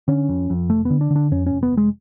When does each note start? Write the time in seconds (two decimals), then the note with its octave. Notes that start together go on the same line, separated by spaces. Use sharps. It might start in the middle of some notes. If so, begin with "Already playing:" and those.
0.08 D3 C#4
0.29 F2
0.50 F2
0.69 F1 A3
0.85 D3 B3
1.01 D4
1.11 D3
1.16 D4
1.31 F2 C#4
1.46 C#4
1.52 F1
1.63 B3
1.72 F1
1.77 G#3